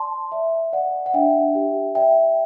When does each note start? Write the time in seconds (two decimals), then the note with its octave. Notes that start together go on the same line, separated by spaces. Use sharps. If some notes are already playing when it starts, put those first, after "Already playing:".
Already playing: D5 A5 C6
0.32 D5 E5
0.73 D5 F#5
1.06 F#5
1.14 D4 E5 G5
1.55 G4
1.95 D5 E5 G5